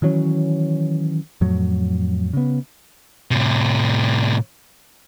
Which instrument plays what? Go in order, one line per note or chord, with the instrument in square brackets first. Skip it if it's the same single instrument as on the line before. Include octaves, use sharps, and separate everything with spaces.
[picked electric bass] D#3 E3 F#3 C#4
F2 A2 F#3
C#3 B3
[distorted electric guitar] A2 C3